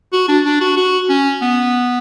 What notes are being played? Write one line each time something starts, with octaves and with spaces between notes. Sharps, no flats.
F#4
D4
D4
F#4
F#4
C#4
B3